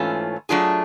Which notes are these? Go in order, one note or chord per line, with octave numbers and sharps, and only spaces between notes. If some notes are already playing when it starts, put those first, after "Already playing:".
Already playing: G#2 E3 A3 C#4 F4
F#3 A3 D4 F4 G#4